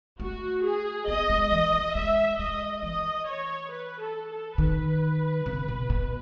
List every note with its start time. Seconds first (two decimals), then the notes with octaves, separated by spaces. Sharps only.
0.20 A3 F#4
0.64 G#4
1.07 B3 D#5
1.30 G#3
1.52 E3
1.73 F#3
1.95 G#3 E5
2.39 G#3 D#5
2.83 E3 D#5
3.27 C#5
3.71 B4
4.00 A4
4.30 A4
4.58 D#3 B4
5.46 C#3
5.68 B2
5.90 B2